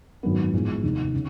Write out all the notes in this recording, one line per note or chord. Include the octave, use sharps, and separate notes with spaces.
G#1 F#2 D#3 F#3 B3
A1 G#2 F3 G#3 B3
F1 D#2 D#3
C#3